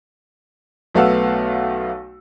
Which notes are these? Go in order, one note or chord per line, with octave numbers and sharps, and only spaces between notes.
B1 A3 B3 F5 F#5 E6